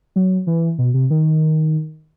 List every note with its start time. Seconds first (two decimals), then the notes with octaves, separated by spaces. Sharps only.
0.16 F#3
0.47 E3
0.78 B2
0.94 C3
1.10 D#3